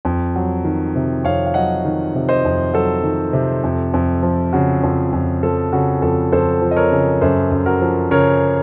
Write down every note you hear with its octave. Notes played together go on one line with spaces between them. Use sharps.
F2
F#3
D#3
C3
F2 C#5 F5
F5
F#3 D#5 F#5
D#3
C3
C5 D#5
F2
F#3 A4
D#3
C3
F2
F2
F3
C#3 F#4
F2
F2
F3 A4
C#3 F#4
F2 A4
F2 A4 C5
F3
D#5
A#4 C#5
C#3
F#2 A4 C5
F#2
F#4 A#4
F3
C#3 A#4 C#5